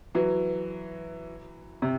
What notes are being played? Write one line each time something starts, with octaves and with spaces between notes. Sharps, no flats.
E3 F#3
C3